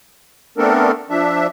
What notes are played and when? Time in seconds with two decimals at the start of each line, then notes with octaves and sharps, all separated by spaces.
0.58 A3 B3 C4 D4 A4 A#4
1.10 F3 D4 E5